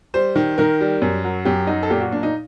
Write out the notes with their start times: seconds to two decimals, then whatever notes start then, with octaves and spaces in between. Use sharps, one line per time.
0.14 G3 C5
0.36 D#3
0.58 D#3 A#4
0.81 G3
1.02 F#2
1.24 F#3
1.45 F#2 G4
1.67 F#3 D#4
1.83 A4
1.90 A#2 G4
2.01 F#4
2.11 A#2 D4
2.23 D#4